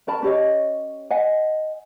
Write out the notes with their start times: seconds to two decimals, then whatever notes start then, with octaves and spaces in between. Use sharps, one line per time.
0.07 C#4 A#4 A5 B5
0.23 C#4 G4 C#5 D#5
1.10 D#5 F#5 G#5